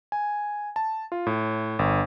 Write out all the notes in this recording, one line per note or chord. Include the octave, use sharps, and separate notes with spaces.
G#5
A5
F4
A2
G1